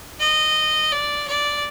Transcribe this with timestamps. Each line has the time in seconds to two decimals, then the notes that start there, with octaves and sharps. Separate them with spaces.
0.20 D#5
0.92 D5
1.28 D5